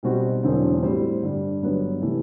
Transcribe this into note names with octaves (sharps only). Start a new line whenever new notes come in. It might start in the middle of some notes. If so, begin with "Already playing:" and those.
B1 B2 G3 C4 F#4
E1 E2 D3 F#3 C4
A2 G3 C4 F#4 C5
G2 D3 G3 D4
G1 G2 F#3 B3
C3 E3 A3